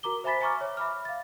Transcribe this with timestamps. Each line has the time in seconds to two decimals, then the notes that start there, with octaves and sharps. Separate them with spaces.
0.03 F#4 A#4 A#5 D6 G7
0.24 C5 E5 G#5 B5 A6 B6
0.41 E5 G#5 A#5 C#6 D6 F6
0.61 C#5
0.77 E5 B5 D6 F6
1.05 F5 A6